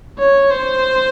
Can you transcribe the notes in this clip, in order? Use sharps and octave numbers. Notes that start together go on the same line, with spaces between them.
C#5
C5